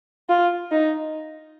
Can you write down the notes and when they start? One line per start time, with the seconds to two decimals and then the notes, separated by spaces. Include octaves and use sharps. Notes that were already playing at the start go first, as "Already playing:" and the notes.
0.29 F4
0.71 D#4